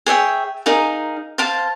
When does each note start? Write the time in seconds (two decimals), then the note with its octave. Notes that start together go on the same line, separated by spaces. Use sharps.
0.06 G#4 C#5 E5 G5
0.66 D#4 G#4 A#4 F5
1.38 C5 F5 A5